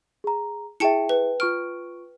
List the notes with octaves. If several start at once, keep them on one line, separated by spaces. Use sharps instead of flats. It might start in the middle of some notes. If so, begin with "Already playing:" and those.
G#4 A#5
E4 G#4 E5 G5 A5 C#7
B4
F4 C#6 F6 D7